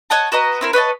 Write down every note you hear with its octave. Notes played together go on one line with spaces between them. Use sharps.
C#5 D#5 F#5 A5
F#4 B4 D#5 A#5
C4 E4 A#4
B4 C#5 D#5 A5